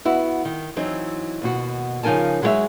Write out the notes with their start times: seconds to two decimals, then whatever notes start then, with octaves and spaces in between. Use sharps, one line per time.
0.05 B3 E4 F#4
0.45 D#3
0.76 E3 F#3 C4 D#4
1.42 D#2 B2 F#4
2.03 C#3 F3 D#4 A#4 G#5 A5
2.42 F#3 G#3 D#4 G#4 C#5 E5